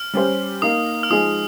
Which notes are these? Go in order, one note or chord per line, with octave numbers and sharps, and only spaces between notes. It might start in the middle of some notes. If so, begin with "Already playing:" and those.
Already playing: F6
G3 C#4 G4 C5
A#3 D#4 A#4 D#6
F6
F3 G#3 D#4 G#4 D#6